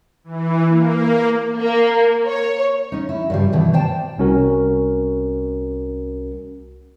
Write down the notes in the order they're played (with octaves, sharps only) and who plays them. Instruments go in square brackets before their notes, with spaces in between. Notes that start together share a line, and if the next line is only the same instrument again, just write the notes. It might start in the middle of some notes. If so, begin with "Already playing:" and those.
[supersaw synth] E3
A#3
[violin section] A#3
C#5
[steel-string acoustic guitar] C#4 D#4
E4
G2 C#3 G3
B2 D#3 E3 E4
C5 D5 G5 A5
[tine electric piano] C2 C#4 F#4 A#4